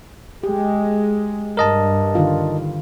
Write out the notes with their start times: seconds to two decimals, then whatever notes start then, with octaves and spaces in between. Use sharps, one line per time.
0.43 G#3 G4
1.57 G2 A#4 D#5 A5
2.15 D3 D#3 F4